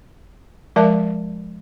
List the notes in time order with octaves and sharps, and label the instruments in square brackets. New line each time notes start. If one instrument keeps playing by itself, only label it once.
[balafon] F3 G#3 A#4 D5 E5 A5